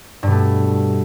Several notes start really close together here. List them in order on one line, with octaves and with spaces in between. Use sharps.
G2 B2 A3